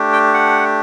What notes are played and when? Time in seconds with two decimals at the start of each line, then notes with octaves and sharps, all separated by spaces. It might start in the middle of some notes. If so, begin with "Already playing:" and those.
Already playing: A3 D4 G4
0.13 G5
0.34 F#5